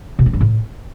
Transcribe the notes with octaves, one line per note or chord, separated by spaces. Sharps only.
B2
C4
G2
A2